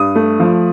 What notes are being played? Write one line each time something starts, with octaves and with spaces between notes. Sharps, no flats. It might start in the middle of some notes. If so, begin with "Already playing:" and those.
Already playing: G2 D#6
A3
F3